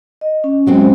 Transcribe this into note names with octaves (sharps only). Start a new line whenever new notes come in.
D#5
C#4
F#3 G#3 C4